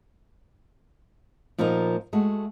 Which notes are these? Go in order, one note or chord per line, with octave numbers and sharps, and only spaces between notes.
A#2 F3 B3 D#4 A#4
G#3 A3 F#4